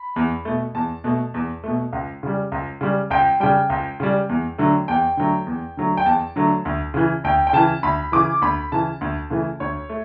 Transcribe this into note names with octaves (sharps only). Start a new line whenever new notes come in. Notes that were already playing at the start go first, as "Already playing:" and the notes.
Already playing: B5
E2
B2 A3
E2 A5
B2 A3
E2
B2 A3
C#2
C#3 G3
C#2
C#3 G3
C#2 G5
C#3 G3 G5
C#2
C#3 G3
E2
D3 F#3 A3
E2 G5
D3 F#3 A3
E2
D3 F#3 A3
G5
E2 A5
D3 F#3 A3
D2
C#3 E3
D2 G5
G5
C#3 E3 A5
D2 B5
C#3 E3 D6
D2 B5
C#3 E3 A5
D2
C#3 E3 A3
D2 C#5
A3